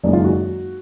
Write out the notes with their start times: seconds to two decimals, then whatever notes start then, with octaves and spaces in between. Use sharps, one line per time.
0.04 F#1 F#2 D#3 G#3 D5
0.13 F4
0.24 F#4